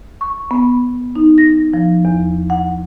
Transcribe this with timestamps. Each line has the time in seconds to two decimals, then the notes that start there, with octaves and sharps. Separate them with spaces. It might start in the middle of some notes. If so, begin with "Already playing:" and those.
0.21 C#6
0.51 B3
1.16 D#4
1.38 A#6
1.74 F3
2.05 E2
2.50 F#5